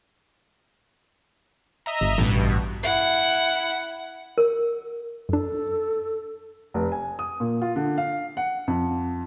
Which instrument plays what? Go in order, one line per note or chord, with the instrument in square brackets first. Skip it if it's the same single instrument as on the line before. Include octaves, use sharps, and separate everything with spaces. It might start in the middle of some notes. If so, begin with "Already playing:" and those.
[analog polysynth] D#5 E5 A#5
[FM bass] G1
[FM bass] A1 [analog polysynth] G2 B2
[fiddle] E4 F#5
[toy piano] A#4
[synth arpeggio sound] F#2 D4 [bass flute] A4
[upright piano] F1
G#5
D#6
A#2
F4
D3
F5
F#5
F2